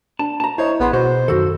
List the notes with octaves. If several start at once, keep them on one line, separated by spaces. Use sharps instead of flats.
D4 A5
A5 A#5
E4 C5 C#5 D#5
A1 B3 G#4 C6
B2 F#4 C5
F#2 D#3 F#4 A4